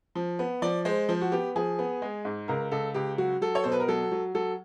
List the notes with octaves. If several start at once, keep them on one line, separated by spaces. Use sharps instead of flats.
F3
B3
F3 D5
G#3 C5
F3 C5
F#4
B3 G4
F3 G#4
B3
G#3
G#2
C#2 A#4
C#2 A4
C#2 G4
F#3 F#4
F#3 A4
C#5
B2 C5
B4
A#4
F#3 A4
F#3
F#3 A4